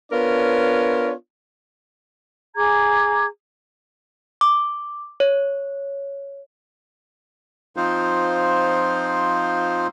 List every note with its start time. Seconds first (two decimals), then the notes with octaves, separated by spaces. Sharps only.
0.12 B3 D4 F4 A#4 C#5
2.56 G#4 A#5 D6 G#6
4.41 D6
5.20 C#5
7.76 F3 C4 D#4 F4 C5